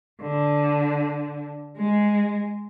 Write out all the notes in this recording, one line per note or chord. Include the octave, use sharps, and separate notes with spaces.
D3
G#3